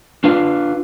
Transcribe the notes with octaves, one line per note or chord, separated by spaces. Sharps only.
D4 F4 B4 F5